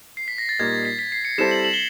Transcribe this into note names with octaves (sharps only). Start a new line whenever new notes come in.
C7
B6
A#6
A6
A#2 G3 A#3 D#4 G#6
A6
B6
B6
C7
C#7
G3 C4 E4 A4 C5 E7
F#7
F#7
G7